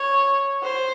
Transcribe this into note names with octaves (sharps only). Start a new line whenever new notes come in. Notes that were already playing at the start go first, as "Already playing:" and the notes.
Already playing: C#5
C5